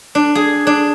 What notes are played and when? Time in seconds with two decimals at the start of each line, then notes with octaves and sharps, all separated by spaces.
0.15 D4
0.35 G#4
0.67 D4